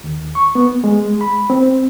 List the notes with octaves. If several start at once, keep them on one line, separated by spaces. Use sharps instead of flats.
D#2
C#6
B3
G#3
B5
C4